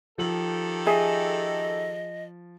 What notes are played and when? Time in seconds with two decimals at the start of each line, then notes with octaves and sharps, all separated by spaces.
0.18 D#3 F3 G4 A4 F#7
0.86 G#4 D#5 E5 G#5